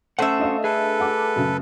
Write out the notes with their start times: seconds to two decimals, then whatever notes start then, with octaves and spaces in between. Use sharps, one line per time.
0.19 A3 C#4 C5 E5 F#5
0.39 D4 D#5 F5
0.64 G#4 A4 B4
1.00 F#5 D6
1.36 F#2 C#3